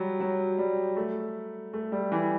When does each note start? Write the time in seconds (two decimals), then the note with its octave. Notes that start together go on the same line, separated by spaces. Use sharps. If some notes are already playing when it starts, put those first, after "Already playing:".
Already playing: F#3 G3
0.20 F#3
0.58 G3
0.97 A3
1.74 A3
1.92 G3
2.12 E3